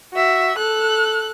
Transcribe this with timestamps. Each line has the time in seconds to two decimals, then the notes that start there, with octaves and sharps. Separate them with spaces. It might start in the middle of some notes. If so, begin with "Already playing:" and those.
0.14 F#4 E5
0.57 A4 F#6